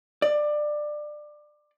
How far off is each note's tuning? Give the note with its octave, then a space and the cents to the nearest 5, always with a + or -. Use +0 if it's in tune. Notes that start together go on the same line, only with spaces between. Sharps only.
D5 +20